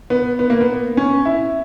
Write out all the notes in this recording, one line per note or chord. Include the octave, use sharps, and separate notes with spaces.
B3
B3
A#3
B3
C#4
E4